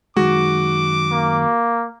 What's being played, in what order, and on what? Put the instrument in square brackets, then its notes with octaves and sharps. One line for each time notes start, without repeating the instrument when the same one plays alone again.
[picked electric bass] F#2 D#3 G#3 [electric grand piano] F#4 [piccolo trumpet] D6
[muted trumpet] A#3